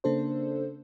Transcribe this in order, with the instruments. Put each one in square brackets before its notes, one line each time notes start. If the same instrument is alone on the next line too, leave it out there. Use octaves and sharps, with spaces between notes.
[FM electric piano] C#3 A#3 D4 A4 C5